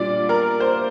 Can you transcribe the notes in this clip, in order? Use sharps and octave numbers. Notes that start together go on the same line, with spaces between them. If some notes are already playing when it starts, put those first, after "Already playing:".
Already playing: A#2 G3 D4 F4 D5
A#4
C5